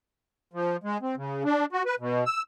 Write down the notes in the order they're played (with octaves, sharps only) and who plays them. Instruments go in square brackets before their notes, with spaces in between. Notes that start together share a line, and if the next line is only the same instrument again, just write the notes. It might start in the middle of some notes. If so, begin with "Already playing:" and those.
[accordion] F3
G#3
C4
C#3
D4
F#4
B4
B2
E6